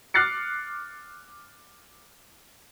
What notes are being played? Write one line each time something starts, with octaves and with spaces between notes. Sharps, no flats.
D6 F6 F#6 A6 C7 C#7